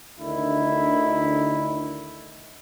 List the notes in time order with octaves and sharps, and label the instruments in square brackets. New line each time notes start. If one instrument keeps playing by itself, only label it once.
[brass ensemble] D2 D3 D#3 E4